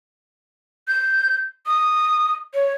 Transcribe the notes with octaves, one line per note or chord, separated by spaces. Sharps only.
G6
D#6
C#5